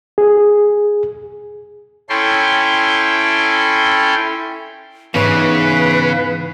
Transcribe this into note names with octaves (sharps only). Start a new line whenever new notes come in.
G#4
C#4 E4 A4 G5 C6
E2 G#2 C#3 B4 C#5